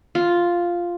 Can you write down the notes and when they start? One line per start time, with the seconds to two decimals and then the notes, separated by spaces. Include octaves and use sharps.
0.15 F4